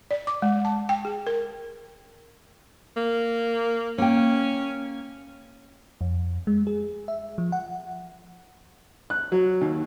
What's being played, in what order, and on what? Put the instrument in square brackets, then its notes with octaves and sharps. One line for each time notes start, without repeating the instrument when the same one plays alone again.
[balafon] D5
D6
G#3
A5
G5
G#4
A#4
[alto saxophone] A#3
[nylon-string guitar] A#3 G5 [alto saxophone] C#4
[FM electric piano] F2
G#3
G#4
E5
F3
F#5
[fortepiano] F#6
F#3
D#2